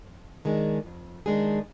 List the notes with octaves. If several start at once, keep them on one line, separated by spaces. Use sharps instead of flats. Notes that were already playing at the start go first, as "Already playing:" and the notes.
F2
D#3 G#3 D4 G#4
F2
D#3 G#3 D4 G#4